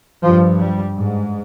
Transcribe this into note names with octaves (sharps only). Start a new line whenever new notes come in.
G2 F3
G3
G#2